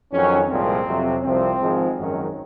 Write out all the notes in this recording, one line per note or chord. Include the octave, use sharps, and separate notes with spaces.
F2 D#3 F#3 C#4
C2 A#2 F3 G#3 C4
F2 C3 F#3
C2 C3 F3 C4
G#1 G#2 F3 G#3
G#1 F#2 D#3 F#3 C#4